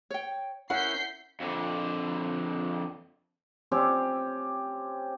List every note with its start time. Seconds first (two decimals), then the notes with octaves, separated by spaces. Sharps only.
0.10 C#5 G5
0.70 C#4 E4 A#4 F#5 G6 B6 C7
1.40 F2 D3
3.71 C4 C#4 G4